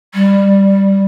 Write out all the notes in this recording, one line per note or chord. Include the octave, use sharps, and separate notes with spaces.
G3